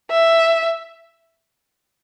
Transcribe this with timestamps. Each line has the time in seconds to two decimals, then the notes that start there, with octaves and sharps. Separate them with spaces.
0.10 E5